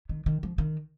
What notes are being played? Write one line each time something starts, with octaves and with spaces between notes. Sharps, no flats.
D#3
D#3
F3
D#3